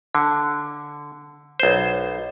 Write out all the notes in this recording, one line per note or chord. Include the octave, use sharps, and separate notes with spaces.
D3
B1 C5